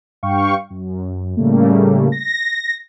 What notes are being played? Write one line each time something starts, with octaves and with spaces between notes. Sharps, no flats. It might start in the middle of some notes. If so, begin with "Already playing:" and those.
G2 F5 G5 C#6
F#2
A2 C#3 G3 A3 A#3
A#6